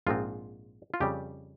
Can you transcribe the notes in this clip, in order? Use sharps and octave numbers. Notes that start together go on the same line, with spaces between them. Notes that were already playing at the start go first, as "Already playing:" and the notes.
A#1 G#2 F3 G#3 C4 F4
F4
F2 C#3 G3 G4